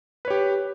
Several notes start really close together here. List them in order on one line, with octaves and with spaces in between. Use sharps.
B4 C#5 G4